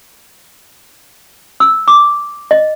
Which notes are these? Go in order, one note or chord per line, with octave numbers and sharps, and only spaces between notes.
E6
D6
D#5